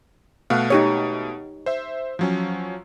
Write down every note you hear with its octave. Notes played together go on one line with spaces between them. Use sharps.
B2 A3 F5 F#5
D#4 G4 C#5
C5 E5
F3 F#3 C#4